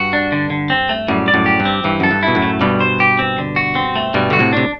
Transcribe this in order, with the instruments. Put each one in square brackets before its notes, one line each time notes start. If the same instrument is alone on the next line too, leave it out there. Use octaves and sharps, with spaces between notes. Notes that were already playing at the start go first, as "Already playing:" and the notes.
Already playing: [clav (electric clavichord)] G2 [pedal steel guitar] F#4
[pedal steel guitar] D4
D3
D3
C4
A3
[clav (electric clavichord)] F#2 A2 [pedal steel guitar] G3
[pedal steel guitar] D5
[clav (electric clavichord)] F#2 A2
[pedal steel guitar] G4
[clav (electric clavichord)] G2
[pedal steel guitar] C4
[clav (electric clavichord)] G2 [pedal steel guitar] E3
[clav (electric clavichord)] F#2 [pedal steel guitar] A4
[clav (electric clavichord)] G2
[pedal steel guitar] E4
[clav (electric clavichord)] B2
F#2 A2
[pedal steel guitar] A3
[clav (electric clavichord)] G2 B2 [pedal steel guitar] G3
[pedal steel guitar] C5
G4
C4
D3
F#4
C4
A3
[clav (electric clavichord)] G2 B2 [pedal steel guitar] G3
[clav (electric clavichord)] D3 [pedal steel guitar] F#4
[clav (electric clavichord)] A2 C3
[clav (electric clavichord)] C3 [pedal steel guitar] D4